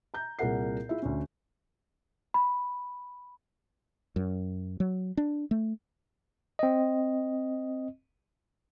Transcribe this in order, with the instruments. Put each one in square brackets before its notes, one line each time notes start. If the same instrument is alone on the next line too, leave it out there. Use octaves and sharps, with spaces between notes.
[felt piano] A#5 G6
C2 A#2 G#4 A#4 F#5 C7
E4 F4 G#4 E5
D2 C#4
[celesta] B5
[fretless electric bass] F#2
F#3
D4
A3
[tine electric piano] C4 D#5